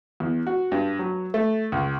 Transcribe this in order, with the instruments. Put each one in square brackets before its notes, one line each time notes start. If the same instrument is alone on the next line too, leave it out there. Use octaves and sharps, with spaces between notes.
[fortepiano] E2
F#4
G2
F#3
A3
C#2